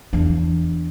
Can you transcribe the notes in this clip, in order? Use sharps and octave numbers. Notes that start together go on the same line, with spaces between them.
E2 D4